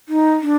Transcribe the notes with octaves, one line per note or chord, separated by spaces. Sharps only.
D#4
D4